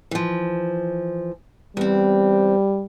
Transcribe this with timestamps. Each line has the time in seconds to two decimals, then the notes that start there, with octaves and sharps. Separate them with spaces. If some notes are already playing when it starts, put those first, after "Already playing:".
0.11 E3 F3
1.77 E2 G3 C4